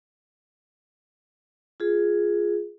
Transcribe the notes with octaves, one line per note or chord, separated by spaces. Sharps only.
F4 G#4